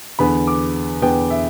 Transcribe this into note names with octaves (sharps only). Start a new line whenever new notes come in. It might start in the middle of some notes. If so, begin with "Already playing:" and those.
E2 D3 B3 B5
D6
E2 D3 B3 G5
E5